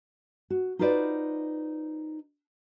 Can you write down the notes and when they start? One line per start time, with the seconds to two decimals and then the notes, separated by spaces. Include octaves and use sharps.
0.50 F#4
0.79 D#4 F4 F#4 B4 C5 D5